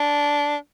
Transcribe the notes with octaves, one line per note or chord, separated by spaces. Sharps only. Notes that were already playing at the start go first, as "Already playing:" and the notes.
Already playing: D4